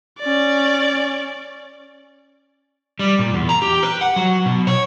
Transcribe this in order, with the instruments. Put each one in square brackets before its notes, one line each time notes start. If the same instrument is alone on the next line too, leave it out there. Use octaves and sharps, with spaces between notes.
[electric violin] C#4 D5
[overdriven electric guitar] G3
A#2
E2
A#5
G4
B4
F#5
F#3
B2
C#5